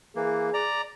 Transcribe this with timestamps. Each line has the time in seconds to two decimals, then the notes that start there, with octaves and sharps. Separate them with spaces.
0.16 E3 A#3 G#4
0.54 D5 A#5